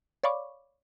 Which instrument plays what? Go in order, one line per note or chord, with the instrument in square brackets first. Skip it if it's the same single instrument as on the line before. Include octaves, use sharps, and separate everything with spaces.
[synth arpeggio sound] C#5 D5 F5 B5 C#6 D6